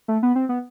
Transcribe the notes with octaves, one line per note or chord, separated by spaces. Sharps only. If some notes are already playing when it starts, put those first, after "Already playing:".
A3
B3
C4
B3